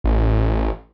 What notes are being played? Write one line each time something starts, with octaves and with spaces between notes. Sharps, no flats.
A1